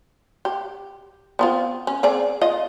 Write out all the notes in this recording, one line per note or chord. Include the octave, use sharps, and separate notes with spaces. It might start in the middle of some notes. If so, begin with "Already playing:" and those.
G4
B3 C4 F4
C#4
C4 G#4 D5
F4 D#5